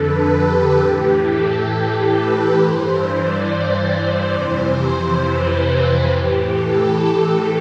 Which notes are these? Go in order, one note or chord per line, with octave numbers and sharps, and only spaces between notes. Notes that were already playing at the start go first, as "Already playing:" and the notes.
Already playing: F2 D3 A4 B4
G4
A2 E3 G4
A4
A4
B4
G2 E3 C5
D5
F2 C3 E3 C5
C5
B4
A2 E3 G4
A4